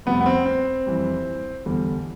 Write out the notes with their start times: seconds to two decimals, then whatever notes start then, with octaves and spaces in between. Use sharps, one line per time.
0.06 F2 C3 G3 B3
0.21 B3
0.26 C4
0.46 C4
0.86 F2 E3 G3
1.66 E2 D3 G3